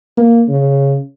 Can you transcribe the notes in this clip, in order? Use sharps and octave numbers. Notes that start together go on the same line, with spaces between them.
A#3
C#3